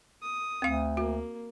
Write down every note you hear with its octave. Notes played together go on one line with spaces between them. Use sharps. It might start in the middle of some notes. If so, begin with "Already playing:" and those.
D#6
D2 C4 F5
A#3 F#4